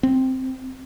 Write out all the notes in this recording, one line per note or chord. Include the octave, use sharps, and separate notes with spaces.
C4